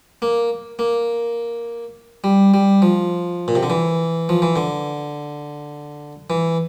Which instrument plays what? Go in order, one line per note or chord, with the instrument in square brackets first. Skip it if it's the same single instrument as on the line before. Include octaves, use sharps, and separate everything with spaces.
[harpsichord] A#3
A#3
G3
G3
F3
A#2
C3
D3
E3
F3
E3
D3
E3